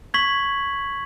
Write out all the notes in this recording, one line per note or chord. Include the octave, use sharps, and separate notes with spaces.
C#6 G#6 B6 F#7